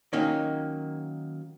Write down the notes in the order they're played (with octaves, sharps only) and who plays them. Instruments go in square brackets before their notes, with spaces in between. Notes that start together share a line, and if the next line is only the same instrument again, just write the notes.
[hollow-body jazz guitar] D#3 F#3 A#3 C#4 D#4